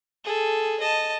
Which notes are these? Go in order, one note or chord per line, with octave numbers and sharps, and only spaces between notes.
G#4 A4
D#5 A5